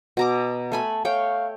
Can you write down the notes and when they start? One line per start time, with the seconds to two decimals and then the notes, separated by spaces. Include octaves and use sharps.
0.17 B2 A#5 D6
0.72 A3 G#5 A5 B5
1.05 A3 C#5 F5 G5